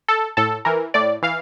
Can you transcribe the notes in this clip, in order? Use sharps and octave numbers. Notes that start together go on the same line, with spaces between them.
A4
A2 A4
E3 A#4
A2 D5
E3 F5